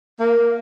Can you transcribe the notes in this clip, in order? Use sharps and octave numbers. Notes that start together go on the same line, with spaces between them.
A#3